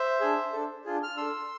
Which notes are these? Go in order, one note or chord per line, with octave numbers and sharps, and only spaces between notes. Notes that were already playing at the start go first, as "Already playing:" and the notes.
Already playing: C5 E5
D4 G#4
D4 A4
D4 F4 G#4
F6
D4 A4 C6 E6